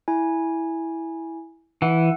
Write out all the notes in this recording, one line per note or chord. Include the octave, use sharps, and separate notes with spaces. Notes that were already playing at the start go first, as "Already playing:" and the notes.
E4 G#5
E3 F#5